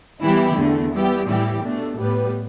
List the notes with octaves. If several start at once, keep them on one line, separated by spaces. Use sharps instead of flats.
E3 G3 B3 E4 G4
E2 D3 A3
G3 B3 E4 G4
A2 E3 G3 E4 G4
B2 A3 D4
A2 G3 B3 G4 B4